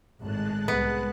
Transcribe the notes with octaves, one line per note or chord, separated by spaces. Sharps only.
G#1 A2 G#3 A5 F#6
C2 B3